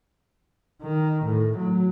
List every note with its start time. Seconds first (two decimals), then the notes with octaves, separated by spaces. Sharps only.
0.82 D#3
1.25 A2
1.57 F#3